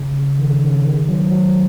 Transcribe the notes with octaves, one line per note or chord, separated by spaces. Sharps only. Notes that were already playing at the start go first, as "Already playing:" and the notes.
Already playing: C#3
D#3
C#3
D#3
C#3
D#3
F#3
F#3